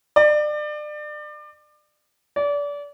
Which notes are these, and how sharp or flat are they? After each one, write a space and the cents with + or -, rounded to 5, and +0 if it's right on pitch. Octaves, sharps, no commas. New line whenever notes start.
D5 +30
D5 -30